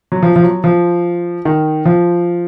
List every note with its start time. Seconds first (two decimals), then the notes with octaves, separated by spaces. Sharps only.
0.12 F#3
0.23 F3
0.36 F3
0.44 F#3
0.64 F3
1.45 D#3
1.86 F3